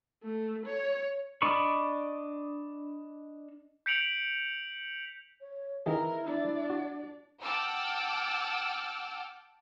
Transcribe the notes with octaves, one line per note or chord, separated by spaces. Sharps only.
A3
C#5
D4 D5 D#5 B5 C#6
G6 B6 C#7 D7 F7 F#7
C#5
D#3 E3 E4 G#4 A#4
D4 D5
F#4
F#5 G5 A5 D6 E6 F6